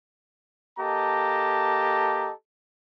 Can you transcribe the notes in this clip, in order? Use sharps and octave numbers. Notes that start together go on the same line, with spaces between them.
A#3 G4 A4 D#5 A5 A#5